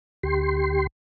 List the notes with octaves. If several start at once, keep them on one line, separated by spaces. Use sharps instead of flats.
D2 G4 C6